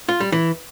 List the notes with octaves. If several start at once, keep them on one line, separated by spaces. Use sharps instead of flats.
F4
G3
E3